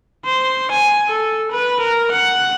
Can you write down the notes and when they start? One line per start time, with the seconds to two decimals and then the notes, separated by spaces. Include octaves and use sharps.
0.25 C5
0.71 G#5
1.08 A4
1.51 B4
1.80 A#4
2.11 F#5